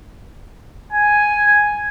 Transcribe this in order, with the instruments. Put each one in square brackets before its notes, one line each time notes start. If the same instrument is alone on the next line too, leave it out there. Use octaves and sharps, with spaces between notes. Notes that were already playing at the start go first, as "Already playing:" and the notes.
[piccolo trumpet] G#5